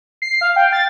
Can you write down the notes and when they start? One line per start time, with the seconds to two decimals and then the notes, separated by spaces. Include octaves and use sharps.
0.22 C7
0.41 F5
0.56 G5
0.73 A6